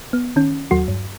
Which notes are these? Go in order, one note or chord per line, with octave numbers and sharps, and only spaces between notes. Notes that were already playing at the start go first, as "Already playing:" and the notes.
B3
D#3 C#4
D#2 F#3 F#4
G2